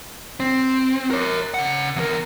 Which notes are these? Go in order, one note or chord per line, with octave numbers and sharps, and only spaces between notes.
C4
A#4 C#5
C#3 F#5
E2 A#4